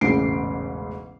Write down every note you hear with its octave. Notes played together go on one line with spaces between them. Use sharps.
E1 A1 G#2 C#3 C7 D7